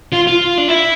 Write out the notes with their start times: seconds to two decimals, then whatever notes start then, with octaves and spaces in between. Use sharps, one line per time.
0.13 F4
0.27 F4
0.58 D4
0.68 E4